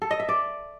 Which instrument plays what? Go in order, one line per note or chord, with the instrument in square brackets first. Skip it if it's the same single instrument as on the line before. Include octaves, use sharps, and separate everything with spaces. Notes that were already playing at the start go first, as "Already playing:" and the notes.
[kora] A4
D#5
E5
D5